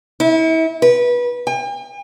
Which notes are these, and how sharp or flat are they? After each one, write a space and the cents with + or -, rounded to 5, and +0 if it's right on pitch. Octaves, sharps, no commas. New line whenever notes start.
E4 -35
B4 -20
G5 +45